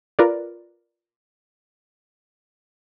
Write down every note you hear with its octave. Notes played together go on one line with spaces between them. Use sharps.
F4 A#4 B4 D5